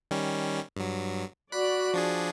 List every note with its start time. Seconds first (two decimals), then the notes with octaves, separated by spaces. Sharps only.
0.11 D#3 G3 C#4
0.76 G2 F#3
1.52 F#4 D5 B5 F#6
1.94 F3 D4 G#4